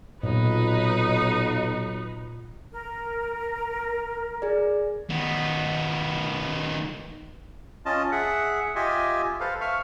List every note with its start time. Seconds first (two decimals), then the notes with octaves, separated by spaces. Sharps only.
0.23 B1 A#2 D#4 B4
2.72 A#4
4.42 G#4 D5
5.10 D#3 B3
7.86 C#4 F4 D#5 A5
8.12 G#4 E5 F#5
8.76 F4 G4 D#5 E5 G#5
9.40 A4 B4 C5 F5
9.61 E5 F5 C#6 F6